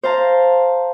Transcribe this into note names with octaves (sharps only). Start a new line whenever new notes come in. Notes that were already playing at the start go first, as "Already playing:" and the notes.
C5 F5 A5 A#5